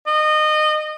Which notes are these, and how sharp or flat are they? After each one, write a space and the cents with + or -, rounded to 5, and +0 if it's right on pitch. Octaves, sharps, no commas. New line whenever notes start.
D#5 -25